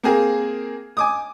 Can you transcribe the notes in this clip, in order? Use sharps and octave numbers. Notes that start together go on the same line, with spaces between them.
A#3 C4 G#4 A#4
G#5 D6 D#6